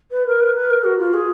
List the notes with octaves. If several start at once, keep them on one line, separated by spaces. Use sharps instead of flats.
B4
A#4
B4
B4
A#4
F#4
F4
G#4